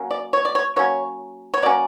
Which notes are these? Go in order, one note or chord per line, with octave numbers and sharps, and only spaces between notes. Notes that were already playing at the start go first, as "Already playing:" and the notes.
Already playing: F#3 A#3 C#4
D5
C#5
D5
C#5
F#3 A#3 C#4 C#5
C#5
F#3 A#3 C#4 D5